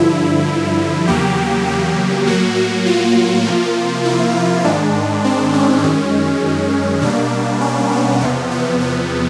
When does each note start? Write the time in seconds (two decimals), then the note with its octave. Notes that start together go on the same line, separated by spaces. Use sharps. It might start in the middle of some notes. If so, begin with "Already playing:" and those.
Already playing: G2 D3 F3 E4
1.07 E2 C#3 F#3 A#3 G4
1.67 G4
2.26 A2 F#3 A#3 F#4
2.56 F#4
2.86 F4
3.46 C3 F3 A#3
4.05 E4
4.64 G#2 D#3 G#3 D4
5.24 C4
5.53 C#4
5.83 F#2 D#3 G#3
7.01 B2 G3 A#3 D4
7.61 C#4
7.91 B3
8.20 E2 C3 F3 B3
8.51 B3
8.80 B3